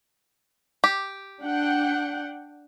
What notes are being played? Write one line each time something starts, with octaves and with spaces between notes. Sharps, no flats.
G4
D4 F#5 G5